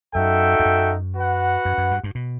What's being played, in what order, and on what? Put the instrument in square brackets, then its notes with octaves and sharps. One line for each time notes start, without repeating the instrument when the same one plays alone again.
[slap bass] F#2 [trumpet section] D#4 F#4 A4 E5 G5
[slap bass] E2
F#2
[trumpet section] F#4 B4 F#5
[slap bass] F#2
F#2
G2
G2
B2